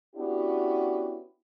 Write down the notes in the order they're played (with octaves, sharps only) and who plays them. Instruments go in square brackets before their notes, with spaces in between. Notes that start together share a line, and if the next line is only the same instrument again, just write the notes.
[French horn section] B3 C#4 D4 E4 F#4 G4